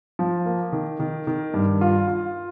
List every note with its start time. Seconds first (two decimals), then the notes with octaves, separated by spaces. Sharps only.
0.19 F3
0.46 A#3
0.72 D#3
1.00 D#3
1.27 D#3
1.54 G2
1.81 F4
2.08 F4